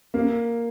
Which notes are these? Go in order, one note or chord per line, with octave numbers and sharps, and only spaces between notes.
A#3